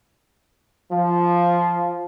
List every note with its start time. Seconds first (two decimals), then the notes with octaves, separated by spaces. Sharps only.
0.91 F3